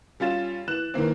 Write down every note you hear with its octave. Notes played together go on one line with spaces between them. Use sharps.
G3 C#4 F4 A6 E7
E3 F#6 E7
D#3 E3 A#3 C4